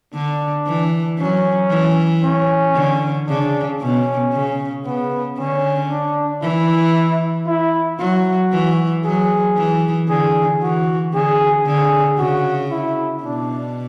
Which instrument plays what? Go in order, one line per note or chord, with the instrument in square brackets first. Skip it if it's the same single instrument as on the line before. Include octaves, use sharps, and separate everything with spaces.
[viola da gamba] D3 [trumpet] D4
[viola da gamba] E3
[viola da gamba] F#3 [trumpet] C#4
[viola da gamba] E3
[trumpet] C#4
[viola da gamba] D3
[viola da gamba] C#3 [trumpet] D4
[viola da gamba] B2 [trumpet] C#4
[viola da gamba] C#3
[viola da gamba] C#3 [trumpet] B3
[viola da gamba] D3 [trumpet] C#4
[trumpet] D4
[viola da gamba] E3 [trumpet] E4
[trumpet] E4
[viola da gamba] F#3 [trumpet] F#4
[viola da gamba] E3
[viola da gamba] F#3 [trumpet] G#4
[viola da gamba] E3
[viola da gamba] D3 [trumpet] G#4
[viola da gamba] E3 [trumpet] F#4
[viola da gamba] D3 [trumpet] G#4
[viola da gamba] D3 [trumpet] G#4
[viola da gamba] C#3 [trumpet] F#4
[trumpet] E4
[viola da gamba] B2 [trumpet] D4